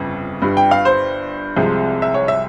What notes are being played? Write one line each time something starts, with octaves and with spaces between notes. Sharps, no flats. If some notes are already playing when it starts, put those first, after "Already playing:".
Already playing: G1 F2 C#3
G1 G2 G3
G5
F5
C5
C2 C3 F3 G#3
E5
C#5
E5